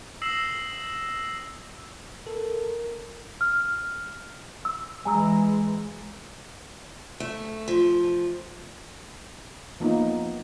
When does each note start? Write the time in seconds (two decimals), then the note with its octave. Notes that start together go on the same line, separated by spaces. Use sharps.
0.22 D#6 E6 A#6 C7 E7 F#7
2.27 A4 A#4
3.41 F6
4.65 E6
5.05 E3 G#3 G#5 A#5 E6
7.20 A3
7.68 F3
9.80 F3 A#3 B3 D#4